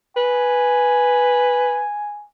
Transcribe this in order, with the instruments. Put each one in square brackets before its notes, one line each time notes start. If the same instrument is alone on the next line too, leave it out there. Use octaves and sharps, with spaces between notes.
[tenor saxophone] B4 [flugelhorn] G#5